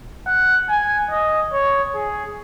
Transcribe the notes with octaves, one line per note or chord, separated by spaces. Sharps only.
F#5
G#5
D#5
C#5
G#4